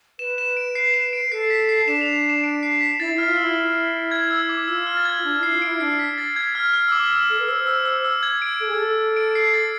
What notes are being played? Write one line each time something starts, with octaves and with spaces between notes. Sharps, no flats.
B4 E7
E7
D7
C7
E7
D7
A4 C7
B6
C7
D4 E7
F7
E7
D7
C7
B6
E4 A6
E4 F6
F4
E6
E4
G#6
E6
D6
F4 E6
F6
A6
G#6
D4
E4
C7
F4
E4 D7
D4 C7
B6
A6
G#6
F6
F6
E6
D6
E6
A4
B4
C5 E6
E6
E6
E6
G#6
D7
A4
G#4
A4
D7
C7
A6